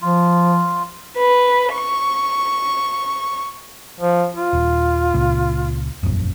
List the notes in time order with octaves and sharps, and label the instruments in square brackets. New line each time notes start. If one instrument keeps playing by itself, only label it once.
[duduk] F3 [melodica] F4
[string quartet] B4
C#6
[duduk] F3
F4
[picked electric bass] D#1
C#2 A#2
E1 A#1 F#2